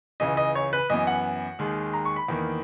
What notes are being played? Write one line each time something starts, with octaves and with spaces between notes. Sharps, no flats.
C#2 C#3 E3 D#5
D#5
C#5
B4
F#2 E3 B3 D#5
F#5
D#2 D#3 G#3
A#5
C#6
B5
E2 D#3 A#3